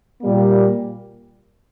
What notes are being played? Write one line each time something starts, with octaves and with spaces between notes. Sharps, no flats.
A#2 G3 A#3